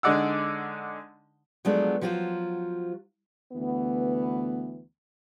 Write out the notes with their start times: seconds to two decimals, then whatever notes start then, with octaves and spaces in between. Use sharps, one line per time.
0.03 D3 G#3 D#4 D5 F#5 E6
1.65 F3 F#3 G#3 A3 B3 D4
2.01 F3 F#3 F4 F#4 C5
3.52 D2 E3 B3